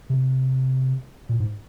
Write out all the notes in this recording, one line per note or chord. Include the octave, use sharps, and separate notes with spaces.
C3
A#2
G#2